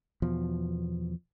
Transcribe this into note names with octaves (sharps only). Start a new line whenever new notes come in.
E2 B2 F3